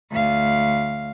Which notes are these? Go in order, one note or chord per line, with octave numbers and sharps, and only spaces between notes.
D2 F5